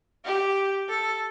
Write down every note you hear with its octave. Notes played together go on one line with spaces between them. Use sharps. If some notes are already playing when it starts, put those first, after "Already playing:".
G4
A4